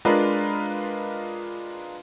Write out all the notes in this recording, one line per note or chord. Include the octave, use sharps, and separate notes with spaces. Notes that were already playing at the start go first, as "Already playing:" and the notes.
G#3 D4 F4 A#4 B4 D#5